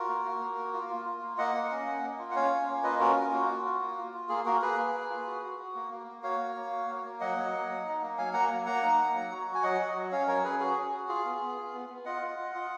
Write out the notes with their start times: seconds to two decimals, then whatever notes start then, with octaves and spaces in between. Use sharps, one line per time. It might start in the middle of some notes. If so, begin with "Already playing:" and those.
Already playing: F4 F#4 A#4
0.08 A#3
0.25 A#3
0.41 A#3
0.58 A#3
0.73 F4
0.90 F4
1.05 F4
1.23 A#3
1.38 A#3 D#5 F#5
1.54 A#3
1.71 C#4
1.86 A#3
2.03 A#3
2.19 F4
2.31 F#5
2.35 C#4 C#5 F5
2.51 C#4
2.68 A#3
2.84 F4 B4 D#5
3.00 C#4 F#4 A#4
3.16 F4
3.32 A#3 F#4
3.49 F4
3.65 F4
3.81 A#3
3.97 F4
4.14 F4
4.29 A#3 G#4
4.45 A#3 F#4 A#4
4.62 A#3 G#4 B4
4.79 A#3
4.94 A#3
5.10 F4
5.27 F#4
5.43 F#4
5.59 F#4
5.75 A#3
5.91 A#3
6.07 A#3
6.23 F#4 C#5 F5
6.39 A#3
6.56 A#3
6.72 F#4
6.88 A#3
7.04 A#3
7.20 F#3 D#5 F#5
7.37 F#3
7.53 A#3
7.69 F#3
7.85 D#4
8.02 A#3
8.18 F#3 F5 G#5
8.33 A#3 F#5 A#5
8.50 F#3
8.66 A#3 F#5 A#5
8.82 D#4
8.99 A#3
9.14 F#3
9.31 F#4
9.47 F#4
9.55 G#5
9.63 F#3 D#5 F#5
9.79 F#4
9.96 F#3
10.11 C#4 C#5 F5
10.27 F#3 A#4 C#5
10.44 C#4 G#4 B4
10.60 F#4 G#4
10.76 C#4
10.93 F#4
11.09 F4 G#4
11.25 B3
11.41 B3
11.57 F4
11.73 B3
11.89 B3
12.05 F4 D#5 F#5
12.22 F4
12.38 F4
12.55 F4